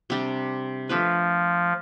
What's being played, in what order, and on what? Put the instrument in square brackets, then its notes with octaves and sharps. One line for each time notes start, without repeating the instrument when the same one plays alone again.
[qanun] C3 G3 D4
[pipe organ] F3 [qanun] A3 D4 F4 B4